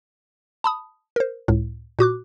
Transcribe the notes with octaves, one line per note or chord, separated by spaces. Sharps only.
A5 B5 D#6
A#4 C5
C#2 A2
A#2 F#4 D6 F#6